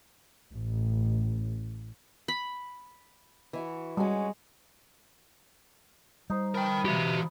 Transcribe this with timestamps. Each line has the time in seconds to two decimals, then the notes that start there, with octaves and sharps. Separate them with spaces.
0.52 A1
2.28 B5
3.53 E3 E4 F#4
3.97 G3 G#3 C#4 F#4
6.30 G3 D#4 C5
6.55 A#4 B4 G5 A5 B5
6.85 E3 F#4 G4 E5